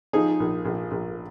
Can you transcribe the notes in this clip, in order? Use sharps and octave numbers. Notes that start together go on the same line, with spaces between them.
F3 D#4 G#4
A#1
A#1
A#1